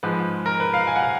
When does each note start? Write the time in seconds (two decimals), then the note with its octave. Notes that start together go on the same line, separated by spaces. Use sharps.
0.03 G#2 F3 G#3 B4
0.46 A#4
0.60 B4
0.74 F5
0.87 G#5
0.96 F#5
1.03 F5